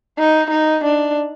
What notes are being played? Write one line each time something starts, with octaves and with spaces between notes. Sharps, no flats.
D#4
D#4
D4